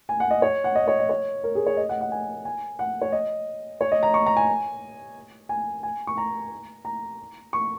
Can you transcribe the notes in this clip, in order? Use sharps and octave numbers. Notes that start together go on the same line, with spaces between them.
G#5
F#5
D#5
C#5
F#5
D#5
C#5
D#5
C#5
A#4
G#4
C#5
D#5
F#5
F#5
G#5
G#5
F#5
C#5
D#5
C#5
D#5
A#5
C#6
A#5
G#5
G#5
G#5
C#6
A#5
A#5
C#6